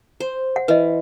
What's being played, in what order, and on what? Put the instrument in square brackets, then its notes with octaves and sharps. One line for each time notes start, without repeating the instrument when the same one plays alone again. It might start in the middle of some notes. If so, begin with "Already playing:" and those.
[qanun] C5
[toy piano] F#5
[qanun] E3 [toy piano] B4 D#5